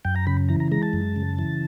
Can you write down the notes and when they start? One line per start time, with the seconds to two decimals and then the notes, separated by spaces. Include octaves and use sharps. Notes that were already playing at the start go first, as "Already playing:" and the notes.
0.05 F#2 G5
0.16 A#5
0.27 C#3 B5
0.49 E3 A#5
0.60 A#5
0.71 G#3 A#5
0.83 A5
0.93 F#2
1.16 C#3
1.39 E3